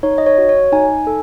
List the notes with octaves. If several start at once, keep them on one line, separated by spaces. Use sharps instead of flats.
D#4 C#5
D#5
C#5
F#4
C#5
D#4 G#5
A4